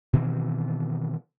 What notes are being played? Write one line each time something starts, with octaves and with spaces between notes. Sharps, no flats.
B2 D#3 E3 C4